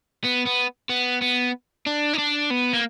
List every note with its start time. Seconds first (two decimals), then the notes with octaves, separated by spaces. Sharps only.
0.24 B3
0.46 B3
0.89 B3
1.21 B3
1.87 D4
2.14 D#4
2.19 D4
2.51 B3
2.73 A#3